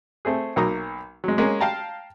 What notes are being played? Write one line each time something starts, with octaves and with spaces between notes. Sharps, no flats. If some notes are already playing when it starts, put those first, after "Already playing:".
A3 C4 G#4
B1 F#3 A#3 A#5 D#6
F#3 G#3
G#3 A#3 C#4
F5 G5 A5 A#5